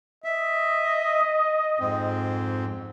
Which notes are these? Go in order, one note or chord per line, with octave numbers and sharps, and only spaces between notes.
D#5 E5
F2 G#2 C4